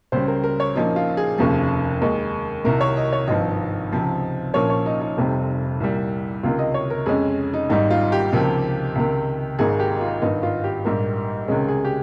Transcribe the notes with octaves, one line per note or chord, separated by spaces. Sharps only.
C#2 C#3 G3 C#4 C5
A#4
A#4
C#5
A#1 A#2 F3 A#3 C#4 D#4
F4
G#4
F1 D#2 C#3 F3
D#2 D#3 G#3
C2 C3 D#3 A#4
C#5
D#5
C#5
G#1 G2 F3 D#5
C#2 C3 F3 C4
A#1 A#2 F3 A#3 C#4 C#5
C#5
D#4
D#4
F1 F2 C3 G3 C4
C2 A#2 G3
C#2 C3 D#3 F4
D#5
C#5
A#4
F2 C#3 G#3 C#4 G#4
D#4
G#1 G#2 G3 D#4
F4
G4
C#2 C3 F3 A#3
C#2 C3 D#3
G#1 G#2 D#3 G#4
G4
F4
G#1 G2 D#3 D#4
F4
G4
A#1 G#2 G3 A#3
C#2 C3 D#3 G#3 C#4 G#4
G#4
G4